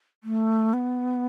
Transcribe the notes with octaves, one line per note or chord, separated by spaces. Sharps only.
A3
B3